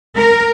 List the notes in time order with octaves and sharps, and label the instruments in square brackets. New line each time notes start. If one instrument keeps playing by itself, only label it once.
[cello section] A#4